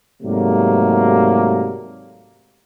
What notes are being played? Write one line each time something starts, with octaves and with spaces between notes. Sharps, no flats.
G#2 C3 F#3 G3 A3 A#3